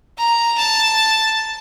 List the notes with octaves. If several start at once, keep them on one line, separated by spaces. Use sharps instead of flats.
A#5
A5